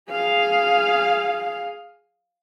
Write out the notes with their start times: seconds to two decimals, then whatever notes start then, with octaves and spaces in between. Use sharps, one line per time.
0.11 G#4 F5